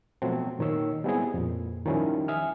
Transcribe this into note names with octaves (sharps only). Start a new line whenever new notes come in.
B2 F3 F#3 A3 C4
A#2 D#3 C#5 E6
G3 G#3 B3 C4 E4 G#4
F2 A#2
D#3 F3 G3 C#4 E4
E5 G#5 D#6 F6